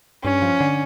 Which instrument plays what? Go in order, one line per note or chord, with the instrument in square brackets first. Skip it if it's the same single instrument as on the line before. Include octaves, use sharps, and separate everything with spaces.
[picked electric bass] G2 [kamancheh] C#4
[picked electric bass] F3
D3